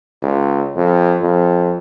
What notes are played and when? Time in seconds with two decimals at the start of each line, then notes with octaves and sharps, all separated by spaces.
0.23 C#2
0.77 F2
1.22 F2